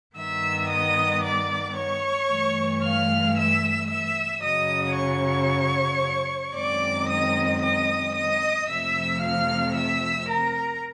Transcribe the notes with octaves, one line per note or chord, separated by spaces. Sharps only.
G2 D#3 G3 B3 E5 E6
D#5 D#6
D5 D6
C#5 C#6
G2 E3 A3
F5 F6
E5 E6
E5 E6
F#2 C#3 F#3 D#5 D#6
C#5 C#6
F#2 D#3 G#3 C4 D5 D6
D#5 D#6
D#5 D#6
D#5 D#6
F2 C3 F3 A3 E5 E6
F5 F6
E5 E6
A#4 A#5